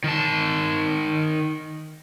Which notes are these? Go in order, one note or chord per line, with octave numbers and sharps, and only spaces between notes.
D#3 A5